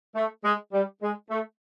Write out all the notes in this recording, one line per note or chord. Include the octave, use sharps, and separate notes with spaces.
A3
G#3
G3
G#3
A3